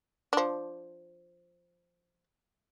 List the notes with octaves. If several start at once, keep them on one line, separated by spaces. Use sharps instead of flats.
F3 D4